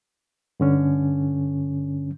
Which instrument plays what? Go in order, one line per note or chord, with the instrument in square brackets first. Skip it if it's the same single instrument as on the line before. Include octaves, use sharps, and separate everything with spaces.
[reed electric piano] G2 D3 C#4